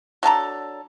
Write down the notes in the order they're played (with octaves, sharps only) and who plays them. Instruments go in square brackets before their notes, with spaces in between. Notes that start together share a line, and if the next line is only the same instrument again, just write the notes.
[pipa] F#3 D4 A4 A#5